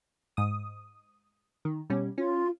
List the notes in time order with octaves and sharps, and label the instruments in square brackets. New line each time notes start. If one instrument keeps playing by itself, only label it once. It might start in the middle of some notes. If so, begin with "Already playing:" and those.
[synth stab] G#2 D#6
D#3
B2 G3 C#4
[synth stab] C#4 [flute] F4